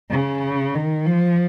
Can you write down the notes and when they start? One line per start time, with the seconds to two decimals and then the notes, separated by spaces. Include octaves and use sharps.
0.11 C#3
0.75 D#3
1.07 F3